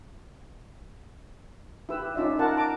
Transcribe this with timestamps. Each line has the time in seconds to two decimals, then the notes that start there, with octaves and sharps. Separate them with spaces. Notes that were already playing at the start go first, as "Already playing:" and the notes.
1.89 E4 G4 B4 E6
2.15 C#4 D#4 F4 D5 E5
2.39 D#4 F4 A#4 F#5 A5
2.57 A5 A#5 D6